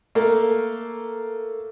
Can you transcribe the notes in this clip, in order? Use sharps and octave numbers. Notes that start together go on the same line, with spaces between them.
A3 A#3